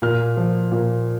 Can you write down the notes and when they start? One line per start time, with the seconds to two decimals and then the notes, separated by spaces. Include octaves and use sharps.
0.02 A#2 F6
0.37 F3
0.72 A#2